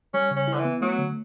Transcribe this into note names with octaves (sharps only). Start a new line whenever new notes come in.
G3 C#4
C#3
C#4
E4
D3
E3
B3
F#3 A3
D3